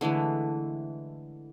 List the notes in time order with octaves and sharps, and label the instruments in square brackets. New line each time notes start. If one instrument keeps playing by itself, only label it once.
[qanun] D3 E3 G#3 A3